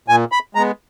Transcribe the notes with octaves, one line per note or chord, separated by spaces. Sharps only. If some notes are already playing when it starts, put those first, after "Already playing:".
A#2 G#5
B5
G#3 B3 A#5